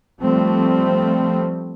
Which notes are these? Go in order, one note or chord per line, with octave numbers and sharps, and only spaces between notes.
F3 G3 A3 C4